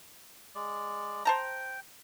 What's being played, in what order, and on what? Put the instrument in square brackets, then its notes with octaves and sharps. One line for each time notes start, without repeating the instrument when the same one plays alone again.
[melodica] G#3 D5
[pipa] C5 A5 A#5 [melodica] G5